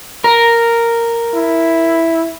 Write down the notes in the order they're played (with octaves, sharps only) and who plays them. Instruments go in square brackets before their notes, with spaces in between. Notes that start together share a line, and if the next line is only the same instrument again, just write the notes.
[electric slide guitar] A#4
[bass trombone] E4